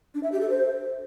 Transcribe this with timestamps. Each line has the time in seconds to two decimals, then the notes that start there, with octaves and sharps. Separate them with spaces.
0.14 D4
0.23 E5
0.32 G4
0.41 A4
0.50 C5